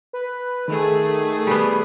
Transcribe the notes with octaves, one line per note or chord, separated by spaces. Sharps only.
B4
D#3 A3 G#4
G3 B3